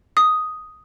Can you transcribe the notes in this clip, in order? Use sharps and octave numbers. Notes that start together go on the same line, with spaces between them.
D#6